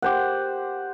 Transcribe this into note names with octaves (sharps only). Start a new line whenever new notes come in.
G4 C5 F#5